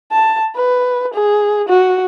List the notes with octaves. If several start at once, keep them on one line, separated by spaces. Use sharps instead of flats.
A5
B4
G#4
F#4